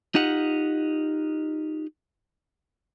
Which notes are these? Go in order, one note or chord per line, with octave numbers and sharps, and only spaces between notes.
D#4 F4 G4 D#5 F#5